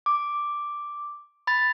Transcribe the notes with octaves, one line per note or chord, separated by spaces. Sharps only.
D6
B5 A6